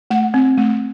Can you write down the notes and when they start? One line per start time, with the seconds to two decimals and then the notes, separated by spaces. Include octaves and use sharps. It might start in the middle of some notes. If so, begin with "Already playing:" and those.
0.10 A3 F#5
0.34 C4
0.57 A3